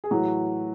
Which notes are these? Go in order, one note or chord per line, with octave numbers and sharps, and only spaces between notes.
G#4
A2 E3 F#3 F#4